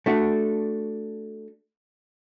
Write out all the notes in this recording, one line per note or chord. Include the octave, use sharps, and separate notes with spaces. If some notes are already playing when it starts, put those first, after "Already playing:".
A3 D4 F#4